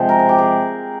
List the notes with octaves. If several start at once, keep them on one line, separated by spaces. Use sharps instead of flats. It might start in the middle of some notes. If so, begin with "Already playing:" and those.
Already playing: C3 F3 G#3 C5
A#4
G#4
G4
G#4